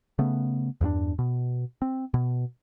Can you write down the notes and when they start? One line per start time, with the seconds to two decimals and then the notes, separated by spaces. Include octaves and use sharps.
0.19 C#3 A3 B3
0.81 E2 G2 A#3 D4
1.19 B2
1.82 C4
2.14 B2